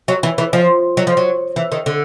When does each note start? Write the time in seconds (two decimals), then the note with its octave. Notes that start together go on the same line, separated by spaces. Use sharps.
0.08 F#3
0.23 E3
0.38 E3
0.53 F3
0.97 F#3
1.07 F3
1.17 F#3
1.56 E3
1.72 D#3
1.86 D3